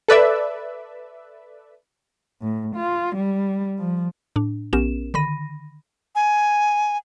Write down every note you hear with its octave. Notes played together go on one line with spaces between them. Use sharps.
A4 B4 D5 E5
A2
F4
G3
F3
A2 D4
A#1 B3 C#4 G4 A#4 E7
D3 D#3 B5 A#6 D#7
G#5